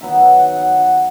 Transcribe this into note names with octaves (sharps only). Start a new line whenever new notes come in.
D#3 F#3 B3 D#4 E5
E5
F#5
F#5
F#5